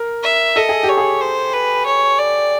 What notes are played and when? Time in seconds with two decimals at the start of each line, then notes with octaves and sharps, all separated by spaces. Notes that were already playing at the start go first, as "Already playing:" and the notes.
Already playing: A#4
0.23 E5
0.56 A4 D#5
0.69 G#4
0.83 G4
0.89 C#5
0.97 G#4
1.21 C5
1.53 B4
1.86 C#5
2.19 D5